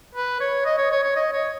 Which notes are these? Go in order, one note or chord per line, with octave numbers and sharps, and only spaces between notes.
B4
C#5
D#5
C#5
C#5
C#5
D#5
C#5